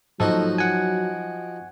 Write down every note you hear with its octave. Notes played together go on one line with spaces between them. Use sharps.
G#2 F3 F#3 A#3 D#4 F#4 A4 C#6
F#5 G#5 D7